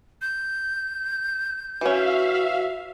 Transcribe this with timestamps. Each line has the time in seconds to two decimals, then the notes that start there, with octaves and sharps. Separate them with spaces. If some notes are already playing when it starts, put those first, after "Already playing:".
0.22 G6
1.81 E3 C#4 F#4 E5 F5